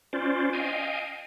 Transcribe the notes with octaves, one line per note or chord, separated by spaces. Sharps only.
C#4 F4 C5 D5
D#5 F5 G5 G#5